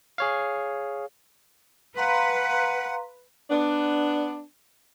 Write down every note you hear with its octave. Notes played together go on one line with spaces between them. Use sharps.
G#4 C#5 F5
B4 F5 F#5 A#5 C6
B3 D4